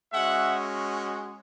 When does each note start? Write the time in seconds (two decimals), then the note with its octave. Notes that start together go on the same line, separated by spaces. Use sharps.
0.13 G#3 C#4 F#4 E5 F#5